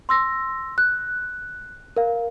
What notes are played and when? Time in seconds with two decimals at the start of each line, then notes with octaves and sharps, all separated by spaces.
0.09 C6 E6 A#6
0.78 F#6
1.96 A#4 F5